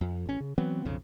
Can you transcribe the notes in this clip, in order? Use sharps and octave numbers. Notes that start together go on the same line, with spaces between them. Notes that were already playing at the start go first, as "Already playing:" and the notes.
F2
A1 C#4
C#3
E3 F#3 B3 C4
B1 F2 C#3